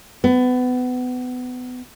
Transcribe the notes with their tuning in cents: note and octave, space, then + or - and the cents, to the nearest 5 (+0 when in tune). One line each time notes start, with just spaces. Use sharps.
B3 +25